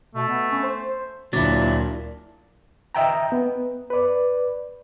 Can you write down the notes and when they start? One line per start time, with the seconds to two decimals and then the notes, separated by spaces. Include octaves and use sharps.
0.15 B2 A3
0.28 B3
0.51 C#4
0.63 C5
1.33 D2 A#2 F#3 D4 E4 A6
2.95 D#5 E5 G5 A#5
3.32 B3
3.90 B4 D5